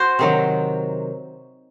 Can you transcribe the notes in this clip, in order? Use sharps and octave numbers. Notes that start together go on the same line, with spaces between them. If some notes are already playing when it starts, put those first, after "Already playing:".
Already playing: F#4 C5
C3 D#3 F#3